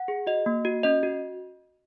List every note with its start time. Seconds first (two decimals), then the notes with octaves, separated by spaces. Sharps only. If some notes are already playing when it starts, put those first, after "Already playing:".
Already playing: F#5
0.08 G#4
0.27 F#4 D#5
0.46 A#3
0.65 F#4
0.83 C#4 D#5
1.03 F#4